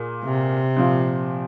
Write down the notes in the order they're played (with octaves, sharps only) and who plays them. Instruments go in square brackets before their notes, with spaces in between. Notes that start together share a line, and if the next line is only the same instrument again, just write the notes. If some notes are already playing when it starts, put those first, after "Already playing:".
Already playing: [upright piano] A#2 A#3 G#4
[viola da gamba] C3
[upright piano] A#2 F3 C4